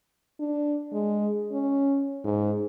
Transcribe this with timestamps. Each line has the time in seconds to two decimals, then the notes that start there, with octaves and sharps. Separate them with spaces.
0.40 D4
0.93 G#3
1.52 C#4
2.24 G#2